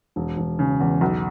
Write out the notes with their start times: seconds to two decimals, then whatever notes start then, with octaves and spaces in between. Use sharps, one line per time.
0.16 E1
0.37 E1
0.59 C#3
0.80 E2
1.01 B1